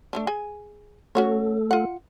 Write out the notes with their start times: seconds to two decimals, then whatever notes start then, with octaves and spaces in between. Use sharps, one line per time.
0.13 A3 C#4 D4
0.27 G#4 G#5
1.15 A3 C#4 F#4 A4 C#5
1.71 F4 F#5